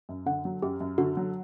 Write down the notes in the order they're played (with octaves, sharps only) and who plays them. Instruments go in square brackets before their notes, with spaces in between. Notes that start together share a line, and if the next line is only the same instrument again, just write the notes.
[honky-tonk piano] F#2
[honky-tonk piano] D3 [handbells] F#5
[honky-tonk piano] F#3
[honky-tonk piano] F#2 [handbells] G4
[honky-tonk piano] F#2
[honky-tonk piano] D3 [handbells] F#4
[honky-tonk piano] F#3